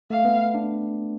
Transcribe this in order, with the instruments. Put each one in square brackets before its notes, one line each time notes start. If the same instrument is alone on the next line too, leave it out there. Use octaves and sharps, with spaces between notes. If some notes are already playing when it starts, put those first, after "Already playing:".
[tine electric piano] A3 [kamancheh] F5
[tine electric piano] B3
D4